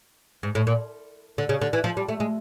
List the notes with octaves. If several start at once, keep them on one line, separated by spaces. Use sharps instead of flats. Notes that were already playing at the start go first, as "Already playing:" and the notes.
G#2
A2
A#2
D3
C#3
D3
E3
F3
G3
A3
G#3